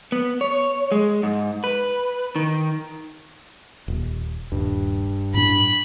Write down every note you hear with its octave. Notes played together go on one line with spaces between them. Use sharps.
B3
C#5
G#3
G#2
B4
D#3
D#1
D#1 G2
A2 D4 B5